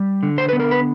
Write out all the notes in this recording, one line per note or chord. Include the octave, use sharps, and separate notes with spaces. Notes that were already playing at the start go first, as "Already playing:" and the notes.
Already playing: G3
D3
C5
B3 B4
A#4
B4